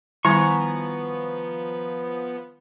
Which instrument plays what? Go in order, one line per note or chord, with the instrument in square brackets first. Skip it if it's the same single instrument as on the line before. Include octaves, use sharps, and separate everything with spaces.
[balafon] D#3 G3 E4 [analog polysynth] F3 B3 [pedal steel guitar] G#5 A#5 C#6